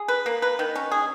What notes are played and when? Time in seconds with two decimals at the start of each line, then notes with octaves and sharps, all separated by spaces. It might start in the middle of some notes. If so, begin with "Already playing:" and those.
Already playing: G#4
0.08 B4
0.26 A#3
0.42 B4
0.59 D#3
0.76 C#4
0.91 G#4